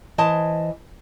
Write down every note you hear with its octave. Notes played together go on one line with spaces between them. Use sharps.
E3 C5 D#5 A5